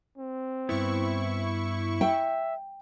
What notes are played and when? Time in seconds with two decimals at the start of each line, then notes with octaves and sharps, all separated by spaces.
0.18 C4
0.69 G2 B3 E4 C#6
2.01 E5 G5